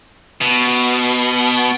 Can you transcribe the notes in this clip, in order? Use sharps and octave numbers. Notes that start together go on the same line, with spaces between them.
B2